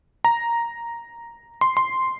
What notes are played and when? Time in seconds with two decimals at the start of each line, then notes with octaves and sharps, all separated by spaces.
0.24 A#5
1.61 C6
1.77 C6